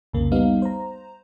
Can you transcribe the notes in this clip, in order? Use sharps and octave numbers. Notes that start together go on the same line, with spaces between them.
C2 F2 C#3 A#3
G3 B3 D#4 F5
C5 A#5